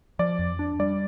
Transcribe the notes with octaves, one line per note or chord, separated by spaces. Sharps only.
F3 D5
F2
D4
G3 D5